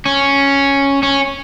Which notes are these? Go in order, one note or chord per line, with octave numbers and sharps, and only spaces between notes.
C#4
C#4